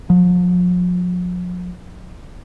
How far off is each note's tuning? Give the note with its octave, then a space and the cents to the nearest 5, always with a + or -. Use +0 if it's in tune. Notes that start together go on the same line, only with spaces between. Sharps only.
F3 +45